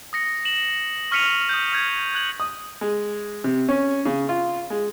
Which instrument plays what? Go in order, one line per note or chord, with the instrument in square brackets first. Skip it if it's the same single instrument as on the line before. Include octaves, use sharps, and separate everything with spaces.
[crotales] D#6 A#6 C#7
E7 F#7
C#6 F6 B6 C#7 D#7 F7
D#6 G6
F6 G6 G#6
F#6 G#6 F#7
[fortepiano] D#6
G#3
C3
C#4
C#3
F4
G#3